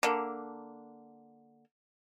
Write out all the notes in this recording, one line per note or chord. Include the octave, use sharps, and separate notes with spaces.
D3 A#3